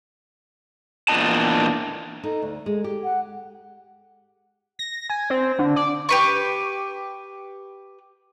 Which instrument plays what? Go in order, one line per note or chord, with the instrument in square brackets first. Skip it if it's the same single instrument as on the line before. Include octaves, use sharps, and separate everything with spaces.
[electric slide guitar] E2 A#2 C#3 D4 D#5 A5
[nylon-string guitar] D#4 [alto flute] A4
[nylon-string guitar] D2
G#3
G4
[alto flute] F#5
[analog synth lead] A#6
G#5
C4
D3
D5
[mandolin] G4 B4 C#6